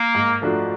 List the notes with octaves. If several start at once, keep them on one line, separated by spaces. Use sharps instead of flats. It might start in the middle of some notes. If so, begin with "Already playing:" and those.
Already playing: A#3
G#2
F3 A3 D4 F#4